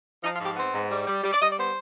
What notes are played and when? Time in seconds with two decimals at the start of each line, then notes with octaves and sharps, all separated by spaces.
0.23 F3 D#4
0.34 F4
0.40 G#2 G4
0.56 B3 C4
0.74 G#2
0.90 G3
1.07 G3
1.23 G3
1.33 D5
1.40 G3 D#5
1.50 D5
1.57 B3 C5